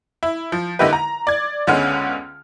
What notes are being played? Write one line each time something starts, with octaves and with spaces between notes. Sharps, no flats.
E4
F3
D3 A#3 D#4 E4 G4 B4
A#5
D5 G#6
C#2 D3 G#3 B3 C#4 F6